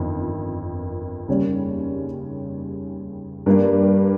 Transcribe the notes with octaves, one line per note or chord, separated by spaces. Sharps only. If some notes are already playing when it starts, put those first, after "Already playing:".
Already playing: G1 F2 D#3
D#2 C#3 G3 C#4
G2 G3 A#3